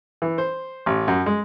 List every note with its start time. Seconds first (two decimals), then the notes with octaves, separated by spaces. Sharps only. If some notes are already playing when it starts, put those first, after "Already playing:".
0.22 E3
0.38 C5
0.86 A1
1.08 F#2
1.26 G#3